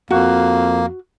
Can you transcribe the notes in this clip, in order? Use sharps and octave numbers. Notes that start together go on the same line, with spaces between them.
F2 A#3 F#4